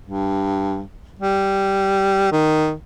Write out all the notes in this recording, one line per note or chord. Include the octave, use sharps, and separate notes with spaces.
G2
G3
D#3